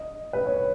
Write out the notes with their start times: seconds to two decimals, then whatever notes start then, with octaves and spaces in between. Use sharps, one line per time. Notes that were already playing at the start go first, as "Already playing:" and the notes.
Already playing: D#5
0.33 B4
0.46 C#5